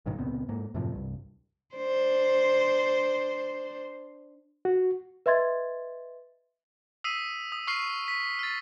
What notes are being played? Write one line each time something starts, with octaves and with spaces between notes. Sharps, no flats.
G#1 G2 B2 D#3
C#2 A#2 B3 C4
G#2 A#3
F#2 A2 C3 F3
C2 G2
D4 C5
F#4
B4 D#5 E5 C6 G#6 A6
D#6 E6 B6 C7 D#7
D#6
C#6 F6 C7
B6
F6 A6